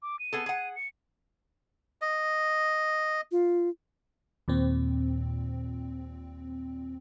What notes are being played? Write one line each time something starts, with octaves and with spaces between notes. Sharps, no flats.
D6
D#7
B3 G#4 A4
G#4 F#5
C#7
D#5
F4
D#2 A#2 C4